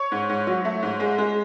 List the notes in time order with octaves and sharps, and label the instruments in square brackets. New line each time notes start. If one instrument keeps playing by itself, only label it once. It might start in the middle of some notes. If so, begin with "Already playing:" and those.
Already playing: [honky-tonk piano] C#5
G#2
G#2
F#3
A3
G#2
G#3
G#3